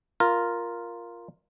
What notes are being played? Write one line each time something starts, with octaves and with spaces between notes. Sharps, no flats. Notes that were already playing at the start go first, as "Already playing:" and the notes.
F4 A#4